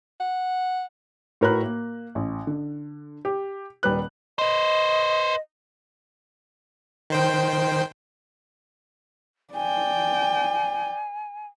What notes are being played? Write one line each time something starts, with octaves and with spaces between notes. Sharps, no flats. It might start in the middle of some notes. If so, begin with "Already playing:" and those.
F#5
A2 F#4 A#4 B4 B5 F#6
A#3
A1
D3
G4
D#1 G3 B4 F#6
B4 C5 D#5
D#3 C5 G5
D5 G5 G#5